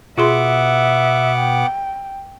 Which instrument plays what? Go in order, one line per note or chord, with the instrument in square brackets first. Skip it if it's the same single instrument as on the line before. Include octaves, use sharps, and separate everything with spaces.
[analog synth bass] B2 [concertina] B3 F#5 D6 [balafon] F4 G#4 C6 [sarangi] E5
[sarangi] G5